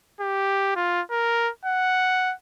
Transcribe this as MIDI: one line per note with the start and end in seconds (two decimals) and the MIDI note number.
0.20 0.72 67
0.76 1.02 65
1.11 1.50 70
1.65 2.34 78